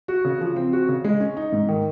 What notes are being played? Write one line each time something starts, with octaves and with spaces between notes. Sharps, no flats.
F#4
C#3
F3
C4
F#4
C#3
G#3
C#4
D#4
G#2
D#3